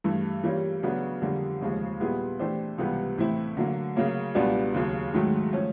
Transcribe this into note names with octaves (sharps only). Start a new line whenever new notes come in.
G2 E3 A3
E3 G3 A#3 C#4 F4
C#3 F#3 B3 D4
F2 D3 G3 A#3
D#2 C#3 F3 G#3
A#2 G3 B3 E4 G#4
E3 A3 D4 G4 C5
C#2 C3 E3 G3 B3
A2 E3 A3 C4 E4
D3 F#3 A#3
C#3 F#3 A#3 C#4
C#2 B2 G3 B3 D4
D#2 C#3 F#3
G#2 D#3 F#3 A3
F3 A3 C#4